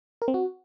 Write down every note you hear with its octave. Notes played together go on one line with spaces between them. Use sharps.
A#4
C4
F#4